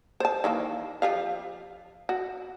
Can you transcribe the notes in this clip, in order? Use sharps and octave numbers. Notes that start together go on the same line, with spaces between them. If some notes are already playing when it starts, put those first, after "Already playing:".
C5 A5
D#3 E3 A#3
F3 G4 F5
F#4